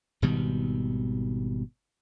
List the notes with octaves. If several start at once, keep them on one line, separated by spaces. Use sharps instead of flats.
G#1 B2 D#3 G3